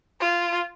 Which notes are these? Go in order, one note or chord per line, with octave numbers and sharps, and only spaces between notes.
F4